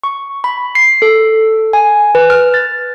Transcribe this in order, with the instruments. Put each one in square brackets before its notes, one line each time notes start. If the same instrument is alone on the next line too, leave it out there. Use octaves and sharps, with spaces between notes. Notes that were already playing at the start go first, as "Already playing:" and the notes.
[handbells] C#6
B5
C7
A4
G#5
B4
F6
A6